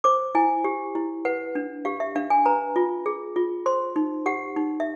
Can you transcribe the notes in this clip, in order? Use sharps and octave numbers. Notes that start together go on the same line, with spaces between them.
C5 D6
E4 G#5
G4
E4
B4 F#5
D4
G4 F5
E5
D4 F5
G#5
B4 A#5
F4
G#4
F4
C5 C6
D#4
G4 F#5
D#4
E5